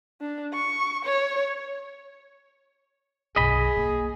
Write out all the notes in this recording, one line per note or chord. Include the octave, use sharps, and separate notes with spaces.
D4
C#6
C#5
B1 F#2 G#4 D#5 B5
A#3